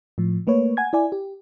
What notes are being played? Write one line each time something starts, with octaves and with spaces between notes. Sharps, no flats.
A2 F3
A3 A#3 B4 C#5
F#5 G#5 G#6
E4 D5 G#5
G4